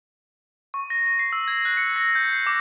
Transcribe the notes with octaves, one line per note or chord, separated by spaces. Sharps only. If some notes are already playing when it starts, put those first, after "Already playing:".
C#6
A#6
A#6
C7
E6
G#6
F#6
C#7
A#6
G6
C7
D6